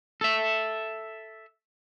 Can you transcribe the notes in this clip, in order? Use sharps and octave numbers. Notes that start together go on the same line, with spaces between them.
A4 E5